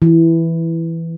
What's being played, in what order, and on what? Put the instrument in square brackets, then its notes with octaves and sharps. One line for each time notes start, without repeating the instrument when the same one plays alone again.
[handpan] E3